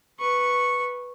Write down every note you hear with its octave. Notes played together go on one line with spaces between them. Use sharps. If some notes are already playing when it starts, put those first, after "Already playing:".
B4 C#6